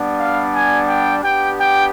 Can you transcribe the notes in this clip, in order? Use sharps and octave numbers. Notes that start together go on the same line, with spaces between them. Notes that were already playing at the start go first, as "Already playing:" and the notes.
Already playing: G3 B3 D4
F5
G#5
G5
B3 D4 G4 G5
G5